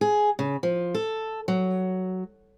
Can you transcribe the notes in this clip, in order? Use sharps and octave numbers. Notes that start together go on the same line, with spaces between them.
G#4
C#3
F3
A4
F#3